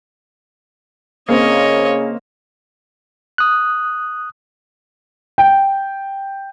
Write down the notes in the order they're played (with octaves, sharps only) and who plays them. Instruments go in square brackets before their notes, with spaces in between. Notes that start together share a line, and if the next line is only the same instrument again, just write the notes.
[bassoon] C#3 [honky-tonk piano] A#3 C4 [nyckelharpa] C#5 D#5
[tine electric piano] D#6 F#6
[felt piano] G5